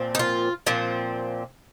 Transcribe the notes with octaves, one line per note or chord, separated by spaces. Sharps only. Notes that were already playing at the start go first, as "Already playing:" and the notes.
Already playing: A#2 F3 C4
D#4
F4
A#2 F3 C4